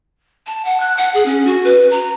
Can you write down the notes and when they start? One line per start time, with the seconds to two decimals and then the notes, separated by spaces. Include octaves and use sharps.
0.47 A5
0.65 F#5
0.80 F#6
0.97 F#5
1.14 G#4
1.26 C#4
1.46 F#4
1.64 B4
1.91 A#5